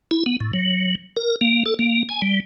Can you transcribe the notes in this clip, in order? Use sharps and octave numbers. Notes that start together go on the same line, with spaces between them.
E4
B3
A2
F#3
A#4
A#3
A4
A#3
G#5
G3